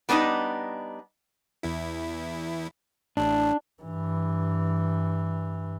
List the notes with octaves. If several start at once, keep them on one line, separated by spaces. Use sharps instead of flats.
G3 B3 D4 D#4 D#5
E2 E4
A1 A2 D4
G2 E3